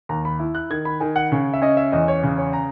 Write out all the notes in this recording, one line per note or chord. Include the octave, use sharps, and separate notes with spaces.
D#2 A#5
B5
E4
F#6
D#3 G#6
B5
D#3 G#5
F#5
C#3
E5
C#4 D#5
E5
E2 D#5
C#5
C#3
C#5
A#5